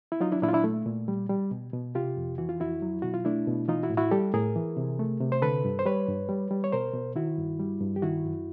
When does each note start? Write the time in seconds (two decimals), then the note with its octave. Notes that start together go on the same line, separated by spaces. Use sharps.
0.12 E4
0.20 F#3 D#4 F4
0.32 D4 E4
0.42 A#2 D4 E4
0.48 F4
0.53 D4 E4
0.64 A3
0.86 A#2
1.08 G3
1.29 G3
1.51 B2
1.73 B2
1.95 C3 F4 G4
2.17 F2
2.38 E3 F#4
2.49 F4
2.60 F2 E4 F#4
2.82 F#3
3.02 B2 F#4
3.14 F4
3.25 A3 D4 E4
3.47 B2
3.68 E3 D#4 F4
3.83 E4 F#4
3.90 A2
3.97 E4 F#4
4.11 G3 G4 A4
4.34 A2 G#4 A#4
4.55 E3
4.77 C3
4.99 A3
5.20 C3
5.32 C5
5.42 D3 A4 B4
5.65 G2
5.79 C5
5.85 G3 B4 C#5
6.08 G2
6.29 G3
6.51 G3
6.64 C#5
6.72 B2 A#4 C5
6.94 B2
7.16 D#3 E4 F#4
7.38 G2
7.60 G3
7.81 G2
7.96 G4
8.02 D#3 E4 F#4
8.25 F#2